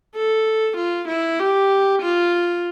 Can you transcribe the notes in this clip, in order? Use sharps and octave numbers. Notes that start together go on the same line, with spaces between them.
A4
F4
E4
G4
F4